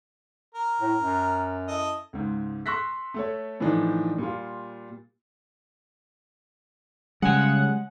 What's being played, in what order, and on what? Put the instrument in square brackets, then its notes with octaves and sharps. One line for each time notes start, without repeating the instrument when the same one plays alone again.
[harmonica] A#4
[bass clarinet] A2
F#2
[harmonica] E4 A4 D#5
[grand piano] C#2 G#2
C6 C#6 E6 F#6 A#6 B6
A3 A4 C#5
A2 E3 F3 D4 D#4
A#2 G3 F4
[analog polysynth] C#3 F#5 [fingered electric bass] G3 [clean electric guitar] G#3 G#5